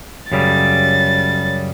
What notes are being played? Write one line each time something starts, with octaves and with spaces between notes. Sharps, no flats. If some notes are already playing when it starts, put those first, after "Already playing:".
F#2 C#3 G3 A6